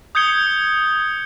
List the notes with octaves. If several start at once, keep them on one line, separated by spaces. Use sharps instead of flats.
D#6 G6 G#6 C#7 G7